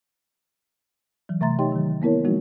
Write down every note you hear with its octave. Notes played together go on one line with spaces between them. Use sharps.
E3 F#3
C3 A3 E5 A#5 C6 A6
D#4 G4 C#5 D#5 G5 C6
D#3 F#3
A#3 B3 E4 A#4 C#5
F3 F#3 G#3 A#3 D#4 F#4